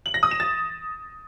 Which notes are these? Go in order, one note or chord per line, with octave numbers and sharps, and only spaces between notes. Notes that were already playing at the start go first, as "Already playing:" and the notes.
F#7
A#6
D#6
E7
A6